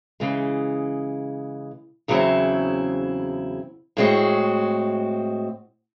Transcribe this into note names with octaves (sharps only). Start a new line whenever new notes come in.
C#3 E3 G#3
E2 C#3 F#3 C4 E4
A2 G#3 C4 F#4